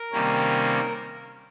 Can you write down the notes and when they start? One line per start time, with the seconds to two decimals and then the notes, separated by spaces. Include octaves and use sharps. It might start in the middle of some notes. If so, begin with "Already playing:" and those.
Already playing: A#4
0.12 C3 D#3 G3 A#3 C#4